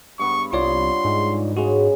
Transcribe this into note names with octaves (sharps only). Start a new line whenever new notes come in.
G2 B3 B5 C#6
C2 F4 C#5 D5 C6
G#2
C#3 G#3 F#4 G#4